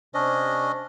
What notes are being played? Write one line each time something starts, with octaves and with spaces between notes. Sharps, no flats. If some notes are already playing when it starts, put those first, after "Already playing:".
C3 C#4 D4 C5 D#5